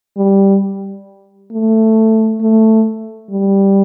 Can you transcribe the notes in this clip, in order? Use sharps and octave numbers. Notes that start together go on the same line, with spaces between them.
G3
A3
A3
G3